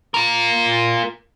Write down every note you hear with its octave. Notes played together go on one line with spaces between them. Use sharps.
F4 A#4